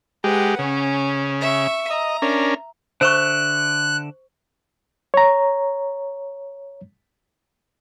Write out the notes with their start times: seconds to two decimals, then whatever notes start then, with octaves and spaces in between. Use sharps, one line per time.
0.24 G#3 G4 B4 F#5
0.59 C#3 C#4
1.41 E5 C#6
1.90 D#5 A#5
2.22 C#4 D4 A#4
3.01 D3 C5 E5 C#6 F#6
5.14 C#5 A#5